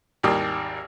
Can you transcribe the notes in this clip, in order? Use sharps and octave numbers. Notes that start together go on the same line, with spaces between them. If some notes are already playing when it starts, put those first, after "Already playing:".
G#1 D#2 G3 A#3 D#6